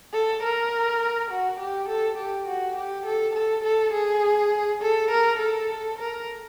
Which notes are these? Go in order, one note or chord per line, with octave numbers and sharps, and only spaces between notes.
A4
A#4
F#4
G4
A4
G4
F#4
G4
A4
A4
A4
G#4
A4
A#4
A4
A#4